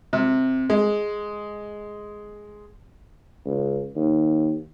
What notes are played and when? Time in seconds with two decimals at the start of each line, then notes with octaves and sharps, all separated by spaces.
0.13 C3
0.70 G#3
3.45 C#2
3.95 D#2